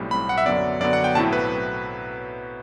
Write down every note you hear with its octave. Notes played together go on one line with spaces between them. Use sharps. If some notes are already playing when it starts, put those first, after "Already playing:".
Already playing: B1 A2 G3 C4
B1 A2 G3 C4 B5
F#5
E5
F#2 D3 F#3 B3 D5
F#2 D3 F#3 B3 D5
F#5
G5
B1 A2 F#3 C4 E4 A5
B4